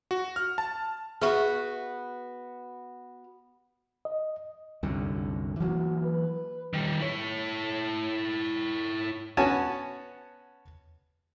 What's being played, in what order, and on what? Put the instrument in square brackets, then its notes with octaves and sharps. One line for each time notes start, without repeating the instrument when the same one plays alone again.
[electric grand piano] F#4
F6
A5
[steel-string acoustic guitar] B3 F#4 B4 [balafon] G#4 E5 C#6
[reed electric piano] D#5
[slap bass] C2 F#2 D3
[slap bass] E3 F#3 A#3 [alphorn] F#4
[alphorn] B4
[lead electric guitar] D#3 G3
E4 C#5
[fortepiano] B3 C#4 F#4 G#5 A5